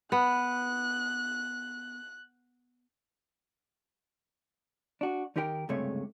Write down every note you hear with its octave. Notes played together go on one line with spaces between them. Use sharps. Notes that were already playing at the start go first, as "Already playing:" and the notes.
B3 F#6
D4 F#4
D#2 D#4 G4 A#4 G5
C#2 G2 C3 G#3 A3 C#5